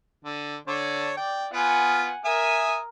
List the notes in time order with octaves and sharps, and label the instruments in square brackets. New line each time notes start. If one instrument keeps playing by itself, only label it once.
[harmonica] D3
D3 D4 C#5
[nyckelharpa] D5 [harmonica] G5
[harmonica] B3 F4 [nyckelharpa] F#5 G#5
[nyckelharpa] A#4 [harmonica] E5 G#5 D#6